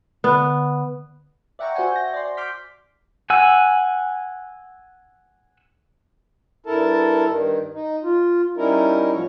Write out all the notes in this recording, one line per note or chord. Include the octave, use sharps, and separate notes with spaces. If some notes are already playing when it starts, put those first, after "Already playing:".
D3 B3
D5 E5 F#5 G5 A#5 C#6
F#4 C5 E5 F#5 G#5
G6 A#6
D5 C6
C6 D6 F6 G6 B6
F#5 G#5 E6
G2 E4 A4 A#4 A5
G2 D#3
D#4
F4
G3 C#4 D#4 E4 A#4
A2 F3 F#3 C#5